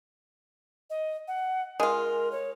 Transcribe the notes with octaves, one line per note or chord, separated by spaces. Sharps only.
D#5
F#5
G#3 F4 A#4
C#5